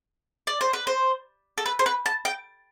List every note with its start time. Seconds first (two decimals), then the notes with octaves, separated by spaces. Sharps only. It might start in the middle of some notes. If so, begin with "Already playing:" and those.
0.47 D5
0.61 C5
0.73 B4
0.87 C5
1.58 A4
1.66 B4
1.79 C5
1.86 B4
2.06 A5
2.25 G5